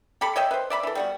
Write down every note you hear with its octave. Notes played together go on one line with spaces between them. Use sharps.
G4 A4 B5
C#5 D#5 E5 G5
B4 C5
D5 E5 B5
E3 A4
G3 B3 F#4